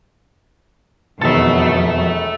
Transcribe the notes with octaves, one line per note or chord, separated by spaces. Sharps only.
E1 F2 B2 D#3 F#3 A4 E5 A6